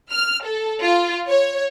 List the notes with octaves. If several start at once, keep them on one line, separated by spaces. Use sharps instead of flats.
F6
A4
F4
C#5